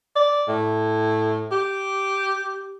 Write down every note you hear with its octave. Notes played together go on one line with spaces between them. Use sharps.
D5
A2
G4